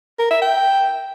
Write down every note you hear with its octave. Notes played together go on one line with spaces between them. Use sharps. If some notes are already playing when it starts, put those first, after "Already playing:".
A#4
E5
G5